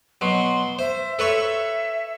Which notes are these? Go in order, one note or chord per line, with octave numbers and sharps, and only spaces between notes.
B2 F#3 C6
C5 E5
A4 B4 C#5 E5